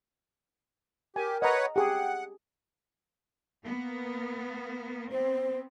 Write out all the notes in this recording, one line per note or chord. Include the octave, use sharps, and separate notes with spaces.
G4 A#4 G#5
B4 C#5 D#5 F#5 A#5
G4 G#4 F#5 G5
A#3 B3
B3 C4 C5